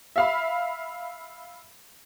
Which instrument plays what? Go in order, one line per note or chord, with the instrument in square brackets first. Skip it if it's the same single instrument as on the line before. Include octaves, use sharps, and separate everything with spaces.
[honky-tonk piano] E5 F5 B5